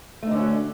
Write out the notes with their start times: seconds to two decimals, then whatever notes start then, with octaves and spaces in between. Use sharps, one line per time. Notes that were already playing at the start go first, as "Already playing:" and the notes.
0.23 A3
0.27 D#4
0.31 D3
0.36 C#4
0.40 F#4